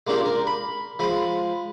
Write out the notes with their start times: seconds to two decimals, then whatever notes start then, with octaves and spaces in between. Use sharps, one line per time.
0.07 G#3 A#3 D4 F4 G4
0.26 A#4
0.47 B5
0.99 F3 G#3 B5